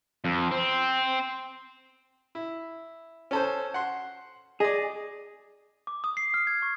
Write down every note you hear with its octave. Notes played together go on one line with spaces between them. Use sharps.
F2
C4
E4
C#4 A4 C5
F#5 C6
G#4 D5 D#5
D6
D#6
C7
F6
G#6
C#6